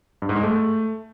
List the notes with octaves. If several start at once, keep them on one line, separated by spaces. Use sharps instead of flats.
G2
G#2
G#3
A3